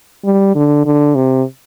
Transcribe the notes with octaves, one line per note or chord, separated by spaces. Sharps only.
G3
D3
D3
C3